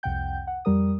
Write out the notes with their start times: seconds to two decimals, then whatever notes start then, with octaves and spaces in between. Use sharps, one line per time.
0.03 C2 F2 C3 F#5 G5 G6
0.47 F#5
0.65 F2 G3 A#4 D#6